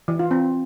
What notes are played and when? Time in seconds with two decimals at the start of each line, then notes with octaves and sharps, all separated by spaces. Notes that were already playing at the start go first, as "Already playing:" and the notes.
0.08 E3
0.19 F4
0.31 C4